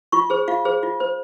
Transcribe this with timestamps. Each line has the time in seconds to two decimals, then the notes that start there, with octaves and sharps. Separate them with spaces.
0.12 F4 C#6
0.30 G#4 C5
0.48 F4 F5
0.65 G#4 C5
0.83 F4
1.00 C5